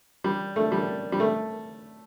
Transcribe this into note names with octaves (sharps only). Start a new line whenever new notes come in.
G3
A3
G3
G3
A3